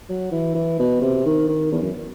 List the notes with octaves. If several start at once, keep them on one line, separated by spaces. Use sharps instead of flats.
F#3
E3
E3
B2
C3
D#3
D#3
E2
F#2